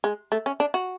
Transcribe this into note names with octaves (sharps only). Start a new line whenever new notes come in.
G#3
A3
C#4
D4
F#4